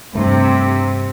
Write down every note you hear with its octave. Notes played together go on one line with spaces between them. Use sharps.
G2 C3 A3